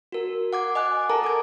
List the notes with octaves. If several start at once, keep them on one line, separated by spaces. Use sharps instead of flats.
F#4 A#4
F#5 D6 G#6
D#5 G#5 D6 F#6
A4 A#4 A5 A#5
D6 G#6